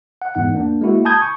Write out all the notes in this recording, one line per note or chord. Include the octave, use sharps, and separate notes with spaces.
F#5
E2 G#2 D#4 F#5
A#3 D4
G#3 A#3 E4 F#4
G#5 A5 B5 D#6 G6 G#6
C#6